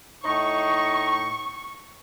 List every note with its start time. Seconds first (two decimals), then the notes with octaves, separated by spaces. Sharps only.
0.24 A2 D#4 C#6